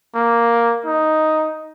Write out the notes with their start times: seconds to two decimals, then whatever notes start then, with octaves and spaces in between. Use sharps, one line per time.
0.15 A#3
0.86 D#4